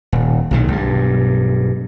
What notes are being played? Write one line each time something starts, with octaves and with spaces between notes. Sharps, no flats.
D#1
B1 A#2 D#3
B1 G2